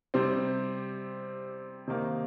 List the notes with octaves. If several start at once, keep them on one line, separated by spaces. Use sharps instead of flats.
C3 G3 C4
C3 D#3 A#3